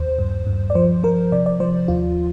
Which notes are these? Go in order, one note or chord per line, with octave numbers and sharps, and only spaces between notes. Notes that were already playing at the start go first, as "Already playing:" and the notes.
Already playing: D#2 C5
G2
G2
D5
F3 C5
F3 A#4
C3 D5
D5
F3 C5
D#2 F4